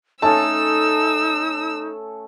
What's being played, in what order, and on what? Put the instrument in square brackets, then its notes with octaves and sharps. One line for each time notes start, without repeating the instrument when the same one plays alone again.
[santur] A3 C#4 A4 [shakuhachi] D#4 [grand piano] A5 [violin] E6